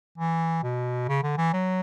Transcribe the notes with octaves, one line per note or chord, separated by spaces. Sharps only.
E3
B2
C#3
D3
E3
F#3